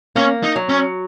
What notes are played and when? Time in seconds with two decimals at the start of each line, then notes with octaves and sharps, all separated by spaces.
0.16 A#3 C#4
0.43 D#4
0.56 F#3
0.69 C#4